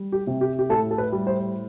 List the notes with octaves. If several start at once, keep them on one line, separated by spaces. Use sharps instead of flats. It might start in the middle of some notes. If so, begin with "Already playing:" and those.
Already playing: G3
G4
C3
G4
G4
A2 A4
A4
B4
G3
C5